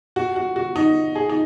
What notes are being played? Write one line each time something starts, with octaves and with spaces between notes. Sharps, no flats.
F#4
F#4
F#4
D#4
G#4
D#4